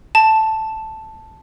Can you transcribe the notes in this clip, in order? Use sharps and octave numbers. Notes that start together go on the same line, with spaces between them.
A5